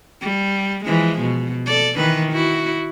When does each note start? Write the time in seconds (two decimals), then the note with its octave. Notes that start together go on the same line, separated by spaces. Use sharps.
0.21 G3
0.84 E3 F3 G#3
1.19 B2
1.66 A4 D5
1.96 D#3 E3 B4
2.32 E4 F#4